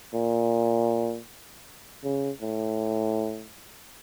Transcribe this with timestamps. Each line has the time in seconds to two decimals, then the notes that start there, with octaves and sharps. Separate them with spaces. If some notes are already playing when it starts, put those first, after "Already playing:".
0.14 A#2
2.04 C#3
2.42 A2